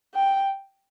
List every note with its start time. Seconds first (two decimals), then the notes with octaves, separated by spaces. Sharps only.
0.15 G5